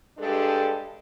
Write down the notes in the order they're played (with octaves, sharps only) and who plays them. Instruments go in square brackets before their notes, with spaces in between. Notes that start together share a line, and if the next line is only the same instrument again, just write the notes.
[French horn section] G2 G#3 D4 G4 A4